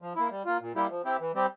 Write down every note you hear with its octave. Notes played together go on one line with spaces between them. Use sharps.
F3
A#3 E4
G3
A#3 F4
A#2
G3 A#3 E4 G4
F3
C4 E4 G4
E3
G3 C4 G4